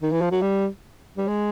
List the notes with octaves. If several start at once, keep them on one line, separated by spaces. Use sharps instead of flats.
D#3
E3
F3
F#3
G3
G3
G#3